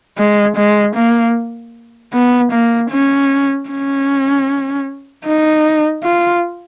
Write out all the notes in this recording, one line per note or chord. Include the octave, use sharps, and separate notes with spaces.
G#3
G#3
A#3
B3
A#3
C#4
C#4
D#4
F4